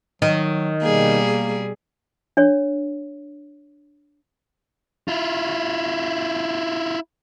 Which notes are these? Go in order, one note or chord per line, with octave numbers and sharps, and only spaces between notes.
D#3 F#3
B2 G3 A#3 G#4
D4 C#5
E4 F4